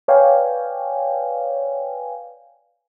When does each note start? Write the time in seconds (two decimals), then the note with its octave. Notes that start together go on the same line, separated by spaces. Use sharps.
0.08 B4 C#5 D5 F5 G5 G#5